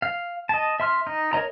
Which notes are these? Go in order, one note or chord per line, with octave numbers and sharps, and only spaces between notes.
F5
D#5 A5
E5 C6 F6
D#4
A#4 C#5 D#5 A#5